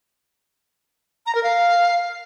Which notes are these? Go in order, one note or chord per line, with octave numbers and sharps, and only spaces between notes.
A#5
A#4
F5